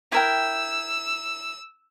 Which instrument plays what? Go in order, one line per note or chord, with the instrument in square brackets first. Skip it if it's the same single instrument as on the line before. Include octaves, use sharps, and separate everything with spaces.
[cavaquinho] E4 A#4 G5 [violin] E6